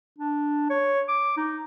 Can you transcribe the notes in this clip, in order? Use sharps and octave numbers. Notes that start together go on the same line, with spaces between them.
D4
C#5
D6
D#4